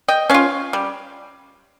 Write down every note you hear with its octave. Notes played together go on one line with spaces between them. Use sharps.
D#5 G5
C#4 F4 C#5 F5
G3